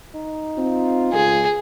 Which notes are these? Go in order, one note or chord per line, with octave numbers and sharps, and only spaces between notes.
D#4
C4 F4
C#2 G#4